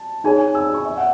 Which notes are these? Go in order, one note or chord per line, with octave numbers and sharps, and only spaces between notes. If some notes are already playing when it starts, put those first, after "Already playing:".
Already playing: A5
D#4 G#4 C#5 G#5
E6
C#6
E5
F#5